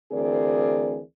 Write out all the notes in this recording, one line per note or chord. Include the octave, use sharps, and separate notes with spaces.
D2 E3 C4 G#4 A#4 D5